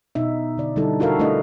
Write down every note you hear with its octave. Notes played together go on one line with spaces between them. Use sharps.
B2 D#4 E5
D3 D5
D3 G3 D#4 E4 A4
E4 F#4 A4 A#4 E5 F5
A3 D4 E4 B4 D#5